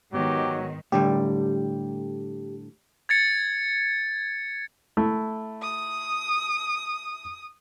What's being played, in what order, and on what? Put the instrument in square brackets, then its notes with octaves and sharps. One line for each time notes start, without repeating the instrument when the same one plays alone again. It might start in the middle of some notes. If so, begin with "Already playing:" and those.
[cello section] G#2 D#3 [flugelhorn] F#3 [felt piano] B3 [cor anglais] G4
[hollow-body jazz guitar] A2 D3 G3 [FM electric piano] G4
[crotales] G#6 A6 C#7
[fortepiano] A3 E4
[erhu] D#6